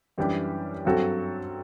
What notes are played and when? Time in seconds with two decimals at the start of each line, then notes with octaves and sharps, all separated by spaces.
0.18 F#2 E3 G3 D4 G4
0.85 G2 F#3 C4 F#4 A4